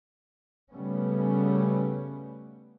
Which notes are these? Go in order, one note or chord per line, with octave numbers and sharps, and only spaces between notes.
C#3 G3 A3 B3 C#4